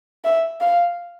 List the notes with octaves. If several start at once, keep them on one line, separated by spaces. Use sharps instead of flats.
E5
F5